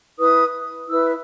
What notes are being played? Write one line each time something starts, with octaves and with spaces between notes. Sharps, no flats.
E4 B4 D#6
E4 B4 E6